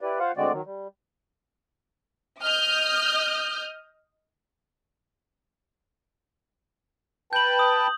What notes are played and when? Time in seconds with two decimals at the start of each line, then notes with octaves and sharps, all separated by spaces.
0.01 E4 G4 B4 D5
0.19 F4 C5 F5 F#5
0.37 D2 D3 G#3 C4 F#4 D5
0.52 D#3 F#3
0.66 G3
2.42 D#5 D#6 F6 G6
7.33 B4 G5 A5 G6 F#7
7.59 D#6